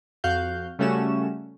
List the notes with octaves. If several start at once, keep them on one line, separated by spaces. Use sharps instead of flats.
F2 F#4 F5 F#6 G6
C#3 G3 A3 C#4 F#4 E7